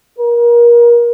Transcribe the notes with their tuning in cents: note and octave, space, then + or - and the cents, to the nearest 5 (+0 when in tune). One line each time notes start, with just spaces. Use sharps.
A#4 +30